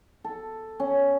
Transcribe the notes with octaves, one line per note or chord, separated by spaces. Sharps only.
A4
C#4